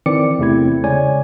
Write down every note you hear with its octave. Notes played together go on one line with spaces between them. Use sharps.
D#3 E3 C4 D5 D6 C#7
E2 C3 A3 C4 E4 G#6
C#3 G#3 C#5 D5 G#5 G#6